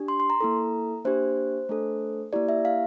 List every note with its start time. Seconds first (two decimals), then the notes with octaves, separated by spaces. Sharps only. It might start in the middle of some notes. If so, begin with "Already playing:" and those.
Already playing: D4 G4
0.08 C6
0.20 C6
0.30 A#5
0.41 A#3 E4 A4
1.05 A#3 D4 G4 C5
1.69 A3 D4 A4
2.33 A#3 E4 G4 D5
2.49 E5
2.65 F5